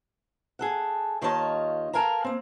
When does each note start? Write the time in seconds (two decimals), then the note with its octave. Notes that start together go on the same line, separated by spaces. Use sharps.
0.59 G#4 A4 F#5
1.21 D#2 D#3 F4 C#5 D#5 A5
1.93 A4 A#4 F5 G#5 A#5
2.24 A#3 C4